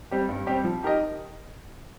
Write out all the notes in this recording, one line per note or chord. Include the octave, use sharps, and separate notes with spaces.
G3 C4 G4
G2
G3 C4 G4
F3
D#4 G4 A#4 D#5